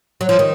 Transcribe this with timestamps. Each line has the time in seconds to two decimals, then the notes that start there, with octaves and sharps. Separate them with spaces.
0.21 F#3
0.29 F3
0.39 D#3